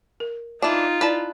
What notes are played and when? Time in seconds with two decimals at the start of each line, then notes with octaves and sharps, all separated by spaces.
0.20 A#4
0.62 E3 D4 D#4 F4
1.01 E4 B4 D5 A5